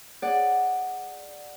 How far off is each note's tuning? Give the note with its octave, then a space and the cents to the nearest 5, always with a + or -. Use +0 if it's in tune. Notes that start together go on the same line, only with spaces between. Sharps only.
G#4 +0 D5 +5 F#5 +0